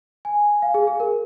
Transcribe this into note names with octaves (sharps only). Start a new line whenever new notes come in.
G#5
F5
G#4
G#4
A#4